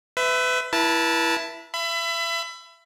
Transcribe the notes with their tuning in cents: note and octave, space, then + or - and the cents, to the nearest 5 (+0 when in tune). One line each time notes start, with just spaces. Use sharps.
B4 +30 E5 +0
E4 +10 B4 -40 A5 +0
E5 +30 B5 +25